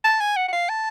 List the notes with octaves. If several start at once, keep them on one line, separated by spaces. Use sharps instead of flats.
A5
G#5
F#5
F#5
F5
A5